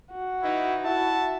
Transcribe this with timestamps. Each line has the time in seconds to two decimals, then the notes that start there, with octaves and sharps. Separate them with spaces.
0.11 F#4
0.43 E3 D#4 E4
0.86 E4 F#4 E5 A5